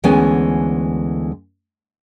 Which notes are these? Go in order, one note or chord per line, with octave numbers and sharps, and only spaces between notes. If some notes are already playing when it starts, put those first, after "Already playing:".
D2 E3 G#3 B3 C#4 G#5